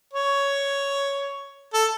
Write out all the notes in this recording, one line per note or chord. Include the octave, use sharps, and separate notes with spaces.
C#5
A4